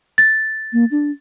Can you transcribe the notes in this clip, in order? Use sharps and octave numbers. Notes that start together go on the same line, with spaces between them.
A6
A#3
D4